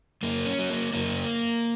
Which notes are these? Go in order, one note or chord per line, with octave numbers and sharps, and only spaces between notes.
F#2 A#3
C#4
F#3
A#3
F#2 A#3